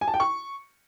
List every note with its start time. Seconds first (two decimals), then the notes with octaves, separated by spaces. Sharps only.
0.01 G#5
0.08 A5
0.14 G5
0.20 C#6